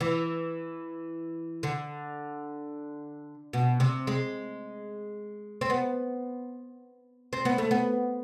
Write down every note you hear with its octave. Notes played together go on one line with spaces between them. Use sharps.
E3
D3
B2
C3
G#3
C4
B3
C4
B3
A3
B3